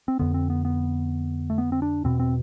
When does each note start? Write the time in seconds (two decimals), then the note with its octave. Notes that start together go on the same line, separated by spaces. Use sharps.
0.08 C4
0.19 F2 D3 B3
0.34 C4
0.50 B3
0.65 B3
1.50 A3
1.58 B3
1.72 C4
1.82 D4
2.04 E2 B2 C4
2.20 C4